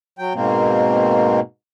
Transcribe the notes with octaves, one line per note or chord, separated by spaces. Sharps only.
F#3 G5
G#2 B2 A#3 C4